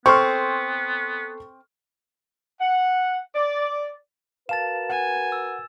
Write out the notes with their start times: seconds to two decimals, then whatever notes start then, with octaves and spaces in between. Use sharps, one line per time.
0.06 B3 C4 A4 C6 C#6 F6
2.61 F#5
3.35 D5
4.49 F#4 A#4 B4 F5 A5 A6 E7
4.90 F#5 G#5
5.32 E6